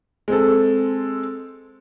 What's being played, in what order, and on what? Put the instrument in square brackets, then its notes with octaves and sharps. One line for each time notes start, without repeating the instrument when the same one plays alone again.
[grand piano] G#3 C4 A4